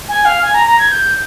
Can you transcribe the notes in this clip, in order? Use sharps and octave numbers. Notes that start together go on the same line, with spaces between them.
G#5
F5
G#5
A#5
A#5
G#6
G6